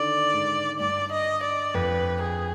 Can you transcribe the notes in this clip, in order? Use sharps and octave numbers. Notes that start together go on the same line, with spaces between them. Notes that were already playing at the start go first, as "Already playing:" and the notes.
Already playing: D3 D#3 D5
G#2
G2 D5
D#5
D5
F2 B4
G#4